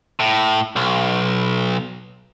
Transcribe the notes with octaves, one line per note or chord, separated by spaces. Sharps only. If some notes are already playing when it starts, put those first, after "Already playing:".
A2
B1